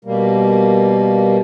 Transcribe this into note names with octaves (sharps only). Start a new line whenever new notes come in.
B2 G3 A#3